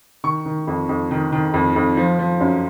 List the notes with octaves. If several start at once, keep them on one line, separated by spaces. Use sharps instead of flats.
D#3 C#6
D#3
F2
F2
D#3
D#3
F2
F2
F3
F3
F#2